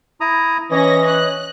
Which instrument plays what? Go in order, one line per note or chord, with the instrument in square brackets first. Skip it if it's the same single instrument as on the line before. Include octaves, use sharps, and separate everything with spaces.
[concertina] E4 A#5 D#6
[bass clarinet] E3 [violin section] C#4 A#6 [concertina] D#5
[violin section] F#6